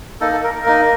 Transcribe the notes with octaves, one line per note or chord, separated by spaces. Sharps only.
A#3 D#4 A4
A4
A#4
A#4
A#3 D#4